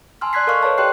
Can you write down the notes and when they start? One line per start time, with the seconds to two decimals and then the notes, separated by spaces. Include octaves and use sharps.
0.21 G#5 A5 C6 E6 F6
0.33 D5 C6 F#6 G#6 B6 C7
0.47 A4 A#4 D#5 F5 C#6 F6
0.63 A4 B4 C#5 D#5 A5
0.78 G4 D5 G5 C6 F#6 C7